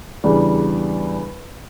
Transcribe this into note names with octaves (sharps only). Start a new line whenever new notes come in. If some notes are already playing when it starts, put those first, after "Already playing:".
E2 C#3 G3 D4